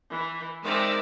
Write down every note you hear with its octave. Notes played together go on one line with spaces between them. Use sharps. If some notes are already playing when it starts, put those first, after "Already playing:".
E3
G#3 C4 D#4 A#4 D5 E5